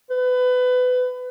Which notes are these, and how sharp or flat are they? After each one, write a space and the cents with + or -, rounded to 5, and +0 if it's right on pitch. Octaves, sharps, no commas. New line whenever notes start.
B4 +25